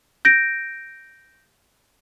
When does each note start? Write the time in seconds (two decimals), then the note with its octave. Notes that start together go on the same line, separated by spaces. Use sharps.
0.25 G6 A#6 D7